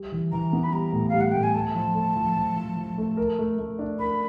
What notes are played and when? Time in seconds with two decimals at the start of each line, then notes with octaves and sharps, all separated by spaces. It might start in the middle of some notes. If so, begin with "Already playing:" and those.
Already playing: G3
0.12 E3
0.32 E3 A#5
0.53 B3
0.64 B5
0.73 G3 A#5
0.93 A2
1.09 G3 F5
1.21 F#5
1.32 A2 G5
1.43 G#5
1.55 A3 A5
1.75 F3
1.95 A3
2.16 F3
2.37 F3
2.56 F3
2.77 F3
2.98 A3
3.17 A#4
3.39 A3
3.59 A3
3.79 D4
3.99 A#4 B5